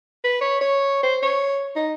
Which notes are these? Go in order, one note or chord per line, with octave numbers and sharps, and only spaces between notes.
B4
C#5
C#5
C5
C#5
D#4